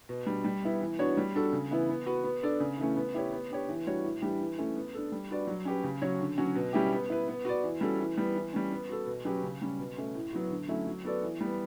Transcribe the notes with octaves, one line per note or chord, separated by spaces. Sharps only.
B2
G3 D4
G3
B3 E4
E3
B3 D4 F#4 C#5
G3
D4 F#4 A4
C#3
E3 B3 E4
B3
F#4 B4
B3
D4 A4 D5
C#3
E3 A3 C#4
B3
E4 G4 C#5
B3
D4 G4 C#5
E3
G3 D4 F#4 C#5
A2
E3 G3 D4 G4
E3
A3 C#4
B3
D4 A4
G3
D4 F#4 B4 D5
F#3
C#4 G4 B4
C#3
F#3 C#4 F#4 C#5
D3
F#3 C#4 F#4
B2
G3 C#4 E4 G4
B3
E4 B4
B3
F#4 B4 D5
E3
G3 C#4 F#4 A4
E3
G3 B3
E3
G3 C#4
B3
F#4 A4
B2
F#3 C#4 G4 B4
C#3
G3 C#4
B2
A3 C#4
A2
F#3 B3 F#4
D3
F#3 A3 C#4 E4
F#3
B3 F#4 A4 D5
E3
G3 B3